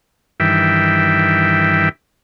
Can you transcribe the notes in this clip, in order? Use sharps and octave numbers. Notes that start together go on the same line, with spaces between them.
G2 D#3 E3 E5 G5